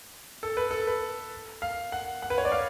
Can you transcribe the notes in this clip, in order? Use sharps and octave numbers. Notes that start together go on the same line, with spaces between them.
A4
B4
A4
B4
F5
F#5
F#5
B4
C#5
D5
F5